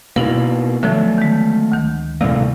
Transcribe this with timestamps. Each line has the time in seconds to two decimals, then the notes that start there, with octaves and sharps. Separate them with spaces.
0.16 B2 A#3 D#4 E4 A#4
0.83 D3 F3 F#3 A3
1.18 D#3 G#3
1.72 D2 D#3
2.21 A2 C3 G3 A#3